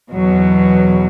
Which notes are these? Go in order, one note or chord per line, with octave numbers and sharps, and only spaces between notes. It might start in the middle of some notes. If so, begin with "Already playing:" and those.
E2 B2 F#3